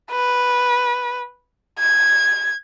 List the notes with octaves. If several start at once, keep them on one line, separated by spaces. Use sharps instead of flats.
B4
G#6